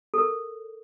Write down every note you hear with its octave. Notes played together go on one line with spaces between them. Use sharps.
A4 A#4